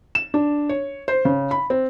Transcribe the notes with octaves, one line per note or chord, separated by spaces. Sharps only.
E7
D4
C#5
C5
C#3
B5
C4